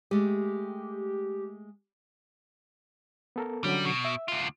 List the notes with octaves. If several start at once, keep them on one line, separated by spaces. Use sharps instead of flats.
G#3 A3 G4
B3 A4 A#4
D3 F#3 G3 C#4
B2
E5
D2 F4